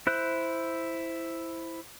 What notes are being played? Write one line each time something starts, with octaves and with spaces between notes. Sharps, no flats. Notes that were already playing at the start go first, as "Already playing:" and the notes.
E4 C5 F#6